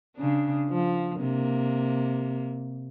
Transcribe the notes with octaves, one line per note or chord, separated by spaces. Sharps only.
C#3 D4
F3
C3 A#3